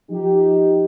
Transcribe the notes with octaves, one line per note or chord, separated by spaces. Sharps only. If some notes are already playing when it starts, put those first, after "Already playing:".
F3 D#4 G4